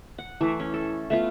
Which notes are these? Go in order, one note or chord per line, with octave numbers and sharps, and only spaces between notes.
F#5
E3 A3 E4
C#4
A4
A3 B3 F4 E5